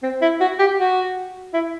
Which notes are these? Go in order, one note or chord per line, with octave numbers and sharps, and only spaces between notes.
C4
E4
F#4
G4
F#4
E4